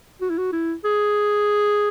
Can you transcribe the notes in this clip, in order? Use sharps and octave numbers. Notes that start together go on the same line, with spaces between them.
F#4
E4
F#4
E4
G#4